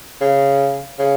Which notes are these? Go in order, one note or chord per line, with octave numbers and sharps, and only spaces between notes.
C#3
C#3